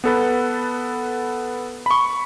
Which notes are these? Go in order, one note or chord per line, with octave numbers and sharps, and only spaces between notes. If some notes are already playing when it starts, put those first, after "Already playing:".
B3 A4 B4
B5 C#6